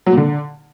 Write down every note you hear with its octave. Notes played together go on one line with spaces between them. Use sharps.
F#3
A#2
D3